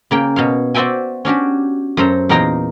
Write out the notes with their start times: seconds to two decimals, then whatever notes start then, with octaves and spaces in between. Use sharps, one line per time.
0.11 C#3 A#3 G5
0.36 B2 C#5 F5
0.74 F#4 C5 D5 E5 G5 G#5
1.25 C#4 D4 F#4 G4
1.97 F#2 A4 C5 A#5
2.29 E2 A#2 D#4 G5 A#5 C6